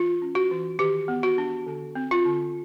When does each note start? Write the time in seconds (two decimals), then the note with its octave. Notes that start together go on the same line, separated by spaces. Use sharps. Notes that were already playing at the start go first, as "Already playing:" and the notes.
Already playing: E3 F4
0.22 C#4
0.35 F#4
0.51 E3
0.79 D#3 G4
1.08 B3
1.23 F#4
1.38 D4
1.66 D3
1.95 C4
2.11 F4
2.26 D3